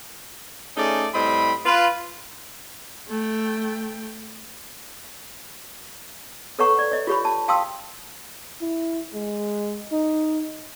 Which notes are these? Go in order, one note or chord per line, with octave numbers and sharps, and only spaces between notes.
A3 C#4 D#4 G#4 D5
A2 G3 C4 D#5 B5
F4 B4
A3 G5
A4 B4 C#5 F#5 A#5 C#6
D5
C#5 D#5
F4 G4 C#5 B5
A5
F5 G5 A5 C6 D#6 E6
E4
G#3
D#4